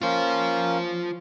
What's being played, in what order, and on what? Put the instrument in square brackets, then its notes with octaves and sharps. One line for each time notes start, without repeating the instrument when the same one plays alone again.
[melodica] A#3 C#4 [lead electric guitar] F4 C5